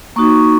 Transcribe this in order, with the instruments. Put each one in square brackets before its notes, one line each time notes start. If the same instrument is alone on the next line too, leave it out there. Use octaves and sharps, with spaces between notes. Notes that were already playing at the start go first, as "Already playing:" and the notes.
[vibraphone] A#3 D#4 F#4 C#6